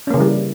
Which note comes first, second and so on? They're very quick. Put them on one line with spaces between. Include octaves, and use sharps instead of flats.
C#4 A#3 C#3 E3 G3